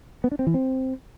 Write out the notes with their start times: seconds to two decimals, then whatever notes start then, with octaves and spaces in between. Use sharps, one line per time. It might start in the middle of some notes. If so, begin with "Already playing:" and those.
0.24 B3
0.32 D4
0.39 C4
0.47 E3
0.54 C4